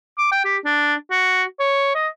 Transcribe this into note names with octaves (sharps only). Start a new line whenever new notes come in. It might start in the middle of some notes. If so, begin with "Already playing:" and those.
D6
G5
G4
D4
F#4
C#5
D#5